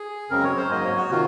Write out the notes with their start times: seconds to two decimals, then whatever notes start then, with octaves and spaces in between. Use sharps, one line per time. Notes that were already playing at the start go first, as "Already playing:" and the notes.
Already playing: G#4
0.30 F#2 C#3 G#3 C4 A#4
0.44 C#5
0.57 C5
0.70 G#2 F#3 A#3 D#5
0.84 C#5
0.97 F#4
1.10 C3 D#3 F4